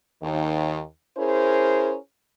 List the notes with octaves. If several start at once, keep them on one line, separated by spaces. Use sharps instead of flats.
D#2 D#3
C#4 E4 G#4 A#4 C5